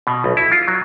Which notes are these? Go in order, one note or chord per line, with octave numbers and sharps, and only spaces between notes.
B2
B1
E4
F4
F#3